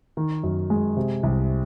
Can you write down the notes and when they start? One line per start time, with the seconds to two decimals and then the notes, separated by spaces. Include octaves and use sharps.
0.17 D#3
0.43 F#2
0.70 G#3
0.97 C3
1.23 C2